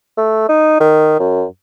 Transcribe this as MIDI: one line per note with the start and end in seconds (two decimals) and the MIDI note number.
0.17 0.48 57
0.49 0.79 63
0.80 1.17 51
1.20 1.44 42